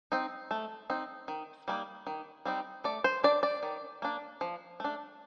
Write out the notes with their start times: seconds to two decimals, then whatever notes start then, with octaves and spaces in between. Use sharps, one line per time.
0.12 C4 D#4
0.51 A3
0.90 C4 D#4
1.28 D#3
1.68 G3 A#3 D#4
2.07 D#3
2.45 G3 C4 D#4
2.84 A3 D5
3.04 C5
3.24 D4 D5
3.43 D5
3.63 D#3
4.02 A#3 D4
4.41 F3
4.80 A3 D4